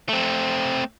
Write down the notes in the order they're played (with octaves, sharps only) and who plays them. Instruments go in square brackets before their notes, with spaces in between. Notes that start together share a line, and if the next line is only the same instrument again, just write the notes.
[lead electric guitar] A3 C4